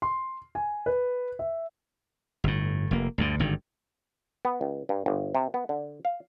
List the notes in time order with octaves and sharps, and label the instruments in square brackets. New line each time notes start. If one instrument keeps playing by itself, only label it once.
[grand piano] C6
G#5
B4
E5
[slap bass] G1 A2
F1 A#3
D2 G2 D3
G#1 G2 D3 D#3
[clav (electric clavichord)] B3
C#2
G2
G1
C3
B3
D3
F5